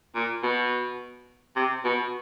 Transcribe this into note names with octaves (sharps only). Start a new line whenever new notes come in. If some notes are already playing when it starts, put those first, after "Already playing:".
A#2
B2
C3
B2